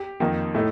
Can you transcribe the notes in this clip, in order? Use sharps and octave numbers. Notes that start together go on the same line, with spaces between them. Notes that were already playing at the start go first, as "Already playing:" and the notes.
Already playing: G4
F2 D#3 A#3 D#4
A2 A3 D#4